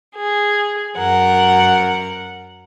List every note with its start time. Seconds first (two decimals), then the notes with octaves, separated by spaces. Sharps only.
0.16 G#4
0.98 F#2 A#4 F#5